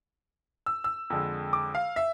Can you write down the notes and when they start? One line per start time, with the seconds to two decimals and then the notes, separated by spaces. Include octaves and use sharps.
0.66 E6
0.84 E6
1.10 F2 D3 G#3
1.53 D6
1.75 F5
1.96 E5